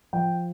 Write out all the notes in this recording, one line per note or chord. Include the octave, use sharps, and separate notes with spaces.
F3 G5